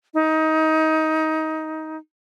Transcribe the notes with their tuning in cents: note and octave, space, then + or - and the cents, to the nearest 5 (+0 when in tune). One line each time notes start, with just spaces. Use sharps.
D#4 +20